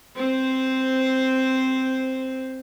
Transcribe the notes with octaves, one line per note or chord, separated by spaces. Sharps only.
C4 C5